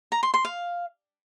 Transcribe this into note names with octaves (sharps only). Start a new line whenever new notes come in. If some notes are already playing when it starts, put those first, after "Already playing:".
A#5
C6
C6
F5